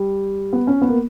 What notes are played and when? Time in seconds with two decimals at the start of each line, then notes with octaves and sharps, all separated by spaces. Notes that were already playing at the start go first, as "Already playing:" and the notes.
Already playing: G3
0.53 B3
0.67 C#4
0.82 B3
0.89 A#3